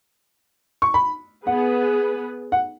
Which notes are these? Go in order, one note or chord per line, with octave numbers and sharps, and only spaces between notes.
C#6
B5
B3 G#4 B4 F#5
F#5